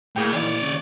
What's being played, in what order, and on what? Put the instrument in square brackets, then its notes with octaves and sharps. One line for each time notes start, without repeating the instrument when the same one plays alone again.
[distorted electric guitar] A2 [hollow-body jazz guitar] A#3 G#4 G5
[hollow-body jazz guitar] A#2 D#3 E3 [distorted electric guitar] C#5 D5
[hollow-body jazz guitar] D#2 C#3